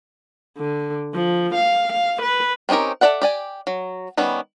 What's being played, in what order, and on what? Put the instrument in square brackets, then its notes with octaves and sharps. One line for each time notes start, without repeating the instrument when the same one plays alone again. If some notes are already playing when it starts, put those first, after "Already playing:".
[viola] D3
F3
F5
F5
B4
[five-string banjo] C4 C#4 D#4 G4 A#4
A4 A#4 D5 E5 F#5
G4 D5 G#5
F#3
D#3 G3 B3 C#4